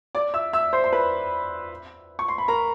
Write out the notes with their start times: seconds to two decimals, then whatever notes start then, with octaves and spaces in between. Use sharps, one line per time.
0.15 D5 D6
0.34 E5 E6
0.53 E5 E6
0.73 C5 C6
0.84 C6
0.92 B4 B5
2.19 C#6
2.28 C6
2.38 B5
2.48 A#4 A#5